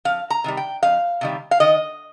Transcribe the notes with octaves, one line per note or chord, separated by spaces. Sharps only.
F2 F5
A#5
C3 D#3 G3
G5
F2 F5
C3 D#3 G3
F5
D#3 D#5